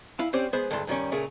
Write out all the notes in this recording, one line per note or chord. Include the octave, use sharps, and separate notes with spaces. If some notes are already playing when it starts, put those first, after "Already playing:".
E4 F5 G#5
C4 C#4 G4 C5 D5
G#3 B3 G#4 C5
D2 G2 G#3 A3 A5 C6
G2 D#3 G3 C#4
A#2 C#3 A3 G#4 A#4